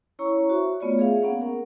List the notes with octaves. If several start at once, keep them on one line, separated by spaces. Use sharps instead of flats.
C#4 E4 C#5 A#5 C#6
F#4 C5 E5
A3 B3 F4 C#5 D5
G#4 E5 F5
A#3 B3 C#4 F#5
A#4